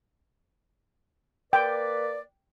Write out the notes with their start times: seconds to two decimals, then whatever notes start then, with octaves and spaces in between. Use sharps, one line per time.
1.53 A#3 B4 D5 G5